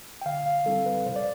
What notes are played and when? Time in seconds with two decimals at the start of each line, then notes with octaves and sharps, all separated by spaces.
0.21 G5
0.26 D3 F5
0.46 F5
0.66 G3 C4 E4 A4
0.86 B4
1.06 C3 C5
1.16 D5